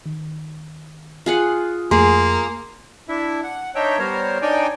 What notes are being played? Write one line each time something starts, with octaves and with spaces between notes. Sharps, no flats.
D#3
F4 G#4 F#5
F2 A3 A#3 G#4 C6
D4 E4 E5
F#5
D4 D#4 C#5 E5 G5
G3 B3 A#4 C5 C#5
D4 D#4 C#5 D5 G5 G#5